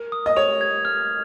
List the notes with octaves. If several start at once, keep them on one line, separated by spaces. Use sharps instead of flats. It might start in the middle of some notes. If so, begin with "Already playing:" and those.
Already playing: A#4
D#6
D#5
C#5 F7
G#6
F6